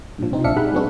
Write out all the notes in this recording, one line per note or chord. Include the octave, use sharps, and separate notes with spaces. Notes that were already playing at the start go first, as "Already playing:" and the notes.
G2 A#2 F3
C3 C4 D#4
A#1 D4 E5 F5 C#7
G3 G#3 D#4 F#5 B5
F#3 G#3 B3 C4 D4 F#4